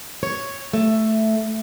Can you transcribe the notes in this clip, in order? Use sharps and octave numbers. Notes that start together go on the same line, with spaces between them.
C#5
A3